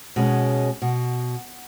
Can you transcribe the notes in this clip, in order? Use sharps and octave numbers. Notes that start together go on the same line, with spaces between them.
B2 G#3 C#4
B2